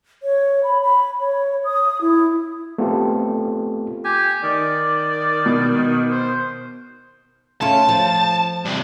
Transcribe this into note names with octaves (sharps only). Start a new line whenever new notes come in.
C#5
B5
B5
C#5
D#6
E4
A3 B3 C4 F4 G4 A4
G4 G#5
D#3 D5
B2
C5
A3 C#4 F4 A5
F3
G2 C3